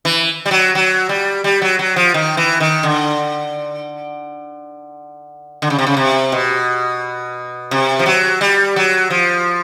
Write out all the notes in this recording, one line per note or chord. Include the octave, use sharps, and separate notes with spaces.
E3
G3
F#3
F#3
G3
G3
F#3
F#3
F3
D#3
E3
D#3
D3
D3
C#3
C3
C#3
C3
B2
C3
F3
F#3
G3
F#3
F3